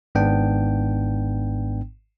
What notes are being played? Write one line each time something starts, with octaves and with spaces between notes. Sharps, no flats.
G#1 G#2 B3 D4 G5